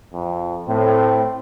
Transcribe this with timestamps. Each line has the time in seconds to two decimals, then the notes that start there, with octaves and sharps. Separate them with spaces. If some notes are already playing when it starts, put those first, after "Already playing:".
0.13 F2
0.68 A2 C4